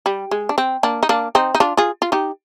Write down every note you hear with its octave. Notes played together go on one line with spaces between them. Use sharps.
G3
G#3
D4
C4
A#3 D4
D#4
A#3 D4
C4 D#4
D#4
D4 F4
F4 G#4
F4
D#4 G4